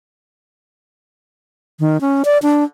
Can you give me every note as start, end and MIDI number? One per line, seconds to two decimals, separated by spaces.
1.80 2.00 51
2.01 2.23 61
2.25 2.38 74
2.43 2.64 62